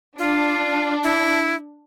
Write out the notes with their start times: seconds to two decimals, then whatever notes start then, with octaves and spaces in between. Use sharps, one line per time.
0.19 D4 F4
1.04 E4